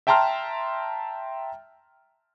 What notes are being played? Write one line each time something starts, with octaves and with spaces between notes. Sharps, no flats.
E5 G5 A5 A#5 C6 F6